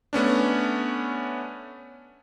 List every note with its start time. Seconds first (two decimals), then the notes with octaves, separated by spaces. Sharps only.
0.13 A3 B3 C#4 D4